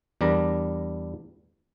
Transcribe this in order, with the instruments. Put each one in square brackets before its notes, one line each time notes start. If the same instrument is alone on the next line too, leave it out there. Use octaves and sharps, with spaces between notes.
[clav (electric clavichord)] E2 G3 D4 A#4 A#5